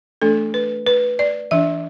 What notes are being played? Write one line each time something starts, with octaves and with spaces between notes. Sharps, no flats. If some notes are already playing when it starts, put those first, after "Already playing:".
E3 A3 D4 A4
B4
B4
D5
E3 D4 E5